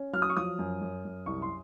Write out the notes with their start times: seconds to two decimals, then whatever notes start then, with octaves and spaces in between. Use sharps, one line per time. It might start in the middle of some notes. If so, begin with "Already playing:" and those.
Already playing: C#4
0.13 F#3 F6
0.22 D#6
0.30 C#6
0.37 F3 D#6
0.59 F#2
0.81 F#2
1.05 F#2
1.26 C2 C#6
1.42 C6